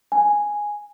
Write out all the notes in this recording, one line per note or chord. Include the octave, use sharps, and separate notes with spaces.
G#5